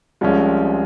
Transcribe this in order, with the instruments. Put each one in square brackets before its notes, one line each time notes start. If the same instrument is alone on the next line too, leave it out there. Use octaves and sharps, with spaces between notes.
[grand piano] C2 C3 F3 G#3 C#4